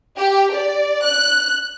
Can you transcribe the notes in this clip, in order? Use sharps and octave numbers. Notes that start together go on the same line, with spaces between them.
G4
D5
F#6